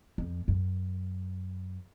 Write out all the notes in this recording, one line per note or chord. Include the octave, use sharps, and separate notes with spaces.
F2
F#2